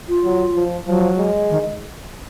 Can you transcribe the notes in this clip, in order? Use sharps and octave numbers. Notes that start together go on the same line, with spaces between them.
F4
F#3
F3
F3 F#3
G#3
D#3